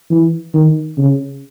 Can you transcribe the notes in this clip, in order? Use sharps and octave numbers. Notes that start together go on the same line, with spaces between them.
E3
D#3
C#3